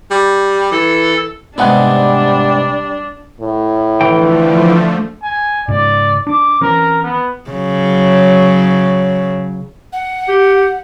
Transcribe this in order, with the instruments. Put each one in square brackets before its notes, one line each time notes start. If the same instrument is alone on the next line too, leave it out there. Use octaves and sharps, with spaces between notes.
[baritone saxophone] G3
[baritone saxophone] E3 [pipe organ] A4
[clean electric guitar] G#2 F#5 [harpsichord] C3 G#3 B3 [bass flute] G3 [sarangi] D4
[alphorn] A2
[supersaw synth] D3 F3 A3 [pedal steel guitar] E3 G5
[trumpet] G#5
[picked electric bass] G#2 C#3 [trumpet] D5
[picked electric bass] D4 [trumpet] D6
[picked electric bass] E3 C4 C#4 [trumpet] A#4
[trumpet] B3
[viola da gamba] C#3 F#3
[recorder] F#5
[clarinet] G4